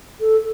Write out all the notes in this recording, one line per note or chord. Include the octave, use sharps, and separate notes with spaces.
A4